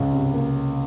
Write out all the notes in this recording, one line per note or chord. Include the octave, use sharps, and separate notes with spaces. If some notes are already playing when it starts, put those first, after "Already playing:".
Already playing: C#2
C3
A#3